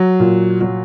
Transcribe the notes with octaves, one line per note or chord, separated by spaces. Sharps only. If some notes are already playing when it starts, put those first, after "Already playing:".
Already playing: F#3
A#2
F#3